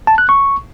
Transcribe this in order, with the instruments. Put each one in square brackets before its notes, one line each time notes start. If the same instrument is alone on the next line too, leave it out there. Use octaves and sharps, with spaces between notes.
[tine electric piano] A5
F#6
C#6